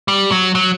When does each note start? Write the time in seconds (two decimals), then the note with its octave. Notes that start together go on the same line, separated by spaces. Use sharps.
0.08 G3
0.32 F#3
0.55 F#3